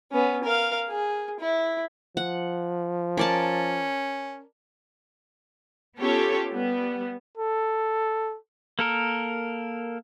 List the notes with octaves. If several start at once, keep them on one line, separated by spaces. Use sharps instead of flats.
B3 C#4
A#4 F5
G#4
E4
F3 F#5
C#4 A#4 D5 A5
B3 C#4 F4 G4 A4 C#5
G3 B3
A4
A#3 A4 A#4